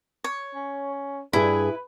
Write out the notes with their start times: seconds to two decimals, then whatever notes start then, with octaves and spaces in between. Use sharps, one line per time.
0.24 C#5
0.55 C#4
1.33 G2 E4 G#4 B4